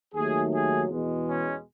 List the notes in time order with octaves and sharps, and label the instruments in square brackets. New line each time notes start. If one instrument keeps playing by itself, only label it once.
[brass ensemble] D#2 D#3 F#3 A3 G#4
G#4
E2 B2 G#3
C#4